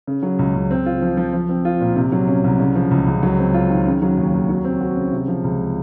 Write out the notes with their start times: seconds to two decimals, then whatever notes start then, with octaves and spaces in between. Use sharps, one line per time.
0.07 C#3
0.23 F#3
0.39 C#2
0.55 C#2
0.71 C4
0.86 F4
1.02 F3
1.17 F3
1.33 F3
1.49 C4
1.65 F4
1.81 A#2
1.96 C3
2.12 F#3
2.28 C#4
2.44 C2
2.60 C#3
2.75 F3
2.91 C#2
3.07 C#2
3.23 F#3
3.39 C4
3.54 F4
3.70 D#3
3.86 C#3
4.02 F#3
4.17 D#2
4.34 D#2
4.49 F#3
4.65 C4
4.81 F#4
4.96 C#3
5.12 C3
5.28 F3
5.44 C#2